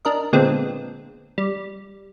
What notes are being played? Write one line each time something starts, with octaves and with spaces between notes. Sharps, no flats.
D4 A#4 D#5
A#2 D3 G#3 B3 C4
G3